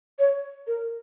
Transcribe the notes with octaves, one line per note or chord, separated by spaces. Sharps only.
C#5
A#4